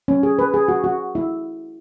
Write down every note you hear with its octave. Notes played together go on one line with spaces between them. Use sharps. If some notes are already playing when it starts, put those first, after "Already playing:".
C#4
G#4
B4
G#4
F#4
F#4
E4